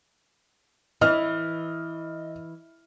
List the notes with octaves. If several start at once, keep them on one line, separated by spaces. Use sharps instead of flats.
E3 D#5 F6